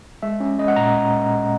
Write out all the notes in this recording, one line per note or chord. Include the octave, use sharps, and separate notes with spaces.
G#3 E5
C#4
G#3 D#5
F#5
A#2 A#5